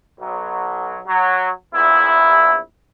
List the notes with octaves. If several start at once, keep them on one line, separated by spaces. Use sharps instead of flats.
B1 F#3
F#3
A#1 E2 E4